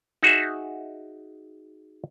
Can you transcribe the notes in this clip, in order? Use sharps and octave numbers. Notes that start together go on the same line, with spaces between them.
D#4 F#4 G#4 E5